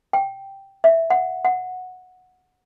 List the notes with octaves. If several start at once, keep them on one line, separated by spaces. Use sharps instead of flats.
G5
E5
F#5
F#5